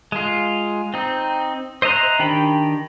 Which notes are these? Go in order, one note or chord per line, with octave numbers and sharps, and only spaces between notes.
G#3 F4
C4 D#4
C5 D#5 E5 A#5 F#6
D#3 D4 G4 G5 B5